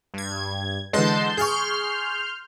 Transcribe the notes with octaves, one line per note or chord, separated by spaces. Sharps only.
G2 G#6
D3 E3 G#3 A5 C6 G6
G#4 C6 C#6 F6 G6